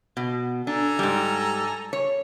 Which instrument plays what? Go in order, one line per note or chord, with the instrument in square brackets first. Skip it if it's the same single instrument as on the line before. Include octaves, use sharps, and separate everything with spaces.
[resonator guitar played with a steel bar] B2
[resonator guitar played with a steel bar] D4 [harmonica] A4 G#5 A#5
[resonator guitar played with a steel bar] G#2 G3
C#5